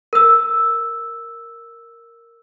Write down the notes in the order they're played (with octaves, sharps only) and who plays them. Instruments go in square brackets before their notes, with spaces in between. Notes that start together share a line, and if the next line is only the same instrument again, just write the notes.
[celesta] A#4 E6